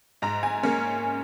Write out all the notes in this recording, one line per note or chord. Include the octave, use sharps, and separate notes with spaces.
G#2 A#5
G#5
A#3 C#4